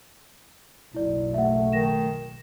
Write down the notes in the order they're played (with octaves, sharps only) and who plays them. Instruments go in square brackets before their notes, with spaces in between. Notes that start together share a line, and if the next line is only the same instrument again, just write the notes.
[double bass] F#1 B1 [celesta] E4 D5
[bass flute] A3 [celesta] E5 F#5
[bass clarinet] D#3 [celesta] A#6 E7